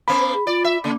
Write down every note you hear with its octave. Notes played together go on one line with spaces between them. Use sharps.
A#3 B3 B5
C5
G#4
F4 D5
E5
C#3 A#3